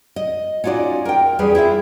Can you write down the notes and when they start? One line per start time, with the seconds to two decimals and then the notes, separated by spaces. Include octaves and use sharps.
0.16 D#5
0.64 C#4 D#4 F4 F#4 D5
1.05 A#4 G5
1.39 E2 G3 C#4 G#4 B4
1.55 E4 F4 G#4 E5